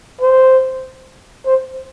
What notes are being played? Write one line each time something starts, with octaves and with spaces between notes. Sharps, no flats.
C5
C5